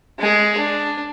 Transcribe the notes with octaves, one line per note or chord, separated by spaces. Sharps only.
G#3 G#4
D4